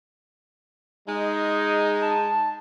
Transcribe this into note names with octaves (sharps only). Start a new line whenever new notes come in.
G#3 D#4
A5